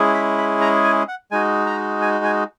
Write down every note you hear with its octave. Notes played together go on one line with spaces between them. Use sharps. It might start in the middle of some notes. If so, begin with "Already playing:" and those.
Already playing: G#3 C#4 E4 G#4
B5
B5
A#5
G#5
F#5
G#3 D#4 F#4 G#5
A#5
G#5
G#5